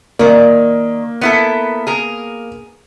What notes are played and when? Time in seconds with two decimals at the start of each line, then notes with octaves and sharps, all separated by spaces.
0.19 D#3 A#3 D5
1.21 B3 E4 A4
1.87 G#4 A#4